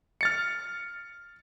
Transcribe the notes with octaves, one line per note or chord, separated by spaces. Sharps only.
F6 A6 C#7